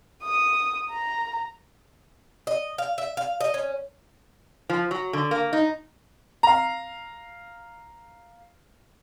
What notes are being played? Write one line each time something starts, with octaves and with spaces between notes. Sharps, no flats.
D#6
A#5
D#5
F5
E5
F5
D#5
C#4
F3
F#3
D3
A#3
D#4
F5 A#5